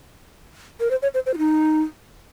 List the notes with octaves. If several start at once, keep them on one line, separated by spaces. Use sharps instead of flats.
A#4
C5
C#5
C5
C5
F4
D#4